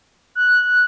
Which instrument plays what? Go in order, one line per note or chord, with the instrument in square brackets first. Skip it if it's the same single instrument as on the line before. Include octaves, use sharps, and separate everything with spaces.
[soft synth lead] F#6